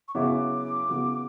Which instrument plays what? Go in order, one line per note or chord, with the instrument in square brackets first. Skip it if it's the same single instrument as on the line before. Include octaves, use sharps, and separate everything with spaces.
[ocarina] C#6
[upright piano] C#3 F#3 B3 E4 [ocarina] D6
[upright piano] C#3 F#3 B3 E4